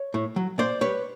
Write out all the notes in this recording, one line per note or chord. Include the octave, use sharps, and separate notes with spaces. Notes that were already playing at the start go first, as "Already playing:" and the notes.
Already playing: C#5
A2
F#3
A#2 C5 D5
G3 B4 C#5